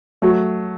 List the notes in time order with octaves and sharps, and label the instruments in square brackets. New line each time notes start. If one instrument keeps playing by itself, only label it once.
[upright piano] F#3 A3 [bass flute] F#4